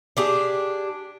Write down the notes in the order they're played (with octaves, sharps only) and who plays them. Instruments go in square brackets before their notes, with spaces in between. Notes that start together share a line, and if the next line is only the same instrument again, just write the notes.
[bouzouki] D4 G4 G#4